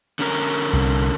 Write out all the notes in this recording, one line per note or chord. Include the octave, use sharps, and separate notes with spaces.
D3 C#4 A#4
C2